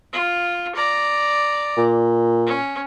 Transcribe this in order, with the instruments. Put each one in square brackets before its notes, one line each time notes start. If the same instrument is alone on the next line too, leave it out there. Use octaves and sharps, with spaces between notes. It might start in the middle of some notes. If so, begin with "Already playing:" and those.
[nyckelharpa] F4
D5 A#5
[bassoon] A#2
[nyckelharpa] C#4